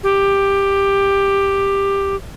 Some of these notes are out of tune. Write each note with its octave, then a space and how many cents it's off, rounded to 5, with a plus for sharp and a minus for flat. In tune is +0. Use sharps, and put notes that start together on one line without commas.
G4 +10